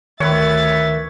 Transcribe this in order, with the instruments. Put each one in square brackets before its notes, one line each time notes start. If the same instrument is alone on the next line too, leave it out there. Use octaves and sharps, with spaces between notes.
[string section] D2 A6 [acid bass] D#3 [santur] B4 C#5 [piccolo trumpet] E5